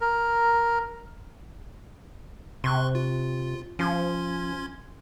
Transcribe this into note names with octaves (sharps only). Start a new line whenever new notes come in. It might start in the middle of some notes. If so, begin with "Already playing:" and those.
A#4
C3 C6 C#6 F#6
F4
F3 C#4 C6 G#6